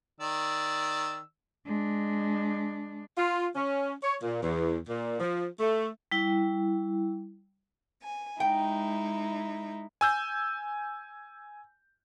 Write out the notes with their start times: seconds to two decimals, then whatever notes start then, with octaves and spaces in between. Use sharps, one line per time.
0.21 D#3 D5 E6
1.66 G#3 D4
3.18 F4
3.56 C#4
4.03 C#5
4.23 A#2
4.42 E2
4.87 A#2
5.20 F3
5.60 A3
6.12 G3 E4 G5
8.02 G#5
8.40 G#3 D#4 E4 G5
10.01 G#5 E6 G6